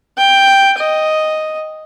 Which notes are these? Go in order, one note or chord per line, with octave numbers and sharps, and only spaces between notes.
G5
D#5